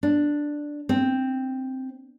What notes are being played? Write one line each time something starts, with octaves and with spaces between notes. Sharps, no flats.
D4
C4